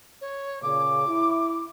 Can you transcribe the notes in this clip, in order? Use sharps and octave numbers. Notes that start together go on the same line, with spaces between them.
C#5
A#2 C#3 D6
E4